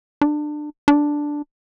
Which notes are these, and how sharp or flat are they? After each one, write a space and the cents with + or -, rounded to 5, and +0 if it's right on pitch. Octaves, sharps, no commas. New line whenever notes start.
D4 +25
D4 +0